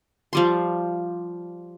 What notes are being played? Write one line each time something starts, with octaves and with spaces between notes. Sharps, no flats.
F3 G3 C6